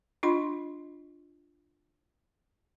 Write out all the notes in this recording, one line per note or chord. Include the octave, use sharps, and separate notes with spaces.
D4 F4 D#5 C6